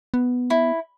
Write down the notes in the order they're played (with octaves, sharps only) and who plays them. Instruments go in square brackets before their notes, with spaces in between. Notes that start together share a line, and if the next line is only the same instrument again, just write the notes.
[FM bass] B3
[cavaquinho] E4